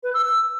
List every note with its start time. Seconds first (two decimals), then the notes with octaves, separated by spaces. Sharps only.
0.03 B4
0.14 E6
0.25 E6